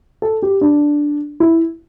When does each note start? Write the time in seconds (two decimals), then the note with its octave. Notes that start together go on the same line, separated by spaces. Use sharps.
0.22 A4
0.42 G4
0.61 D4
1.40 E4